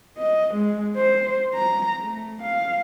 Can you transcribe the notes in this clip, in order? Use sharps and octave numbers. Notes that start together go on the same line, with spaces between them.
D#5
G#3
C5
A#5
A3
F5